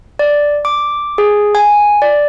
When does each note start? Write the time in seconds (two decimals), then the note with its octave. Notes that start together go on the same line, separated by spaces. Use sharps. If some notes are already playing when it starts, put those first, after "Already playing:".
0.19 D5
0.65 D6
1.18 G#4
1.55 G#5
2.02 D5